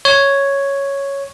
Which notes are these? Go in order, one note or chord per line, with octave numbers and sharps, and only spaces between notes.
C#5